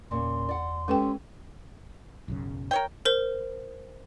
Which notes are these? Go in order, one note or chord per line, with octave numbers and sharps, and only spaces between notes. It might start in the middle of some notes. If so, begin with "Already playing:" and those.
E2 A#2 C#3 C6
D5 F#5
G#3 C#4 G4 A4 B4 G5
B1 F#2 C#3
A#4 C#5 G5
A#4 C5